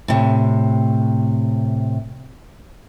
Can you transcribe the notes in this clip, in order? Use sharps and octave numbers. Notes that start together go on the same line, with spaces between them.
A2 C3